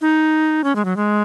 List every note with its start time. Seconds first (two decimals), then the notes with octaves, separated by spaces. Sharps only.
0.01 D#4
0.64 C#4
0.76 G#3
0.85 F#3
0.97 G#3